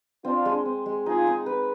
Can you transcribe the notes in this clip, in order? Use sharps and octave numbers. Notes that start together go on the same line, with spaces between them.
C4 D4 F4
G#3
C4
G#3
D#4 F4 G#4
D#4
B4